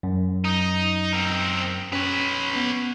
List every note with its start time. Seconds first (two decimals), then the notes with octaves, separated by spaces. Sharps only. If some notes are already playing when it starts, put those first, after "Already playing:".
0.03 F#2
0.45 D#4
1.13 C4 A#4
1.93 C#4 B4 C#5
2.56 B3